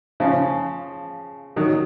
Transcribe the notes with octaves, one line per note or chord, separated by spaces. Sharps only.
C#3 F3
D#3 F#3